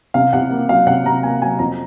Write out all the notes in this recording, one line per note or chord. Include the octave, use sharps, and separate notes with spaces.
C3 F5
C3 F#5
A#3
F#3 F5
C3 F#5
C3 A#5
A#3 G#5
F#3 G#5
F2 A#5